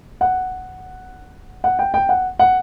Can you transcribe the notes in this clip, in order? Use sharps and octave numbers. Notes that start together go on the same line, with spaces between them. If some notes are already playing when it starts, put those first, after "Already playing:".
F#5
F#5
G5
G5
F#5
F#5